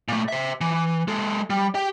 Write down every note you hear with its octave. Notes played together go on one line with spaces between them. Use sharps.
A#2 A3
C5 E5
E3
G#3 A4
G3
G4 G5